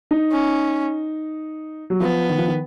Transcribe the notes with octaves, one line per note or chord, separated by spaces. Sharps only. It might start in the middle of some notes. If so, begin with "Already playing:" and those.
D#4
C#4
F#3
F3 B3
D#3
F3
D#3